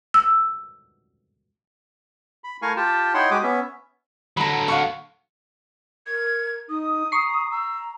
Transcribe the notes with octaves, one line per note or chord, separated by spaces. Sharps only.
E6
B5
A3 E4 A#4 F5 G#5 C#6
F4 G4 G5 A5
D#4 E4 C#5 F#5 G5 C6
G#3 F#4 G4 D6 D#6
B3 C#4 E5
D3 F#3 A#5 B5
F5 F#5 C#6
A#4 G#6
D#4 D#6
A#5 C#6 C7
A#5 E6